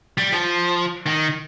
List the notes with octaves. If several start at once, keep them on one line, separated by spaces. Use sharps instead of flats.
G3
F3
D#3